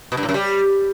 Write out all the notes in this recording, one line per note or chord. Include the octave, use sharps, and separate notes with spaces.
B2
G2
A2
F#2
G3